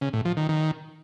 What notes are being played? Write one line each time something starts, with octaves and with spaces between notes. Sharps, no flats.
C#3
A2
F3
D#3
D#3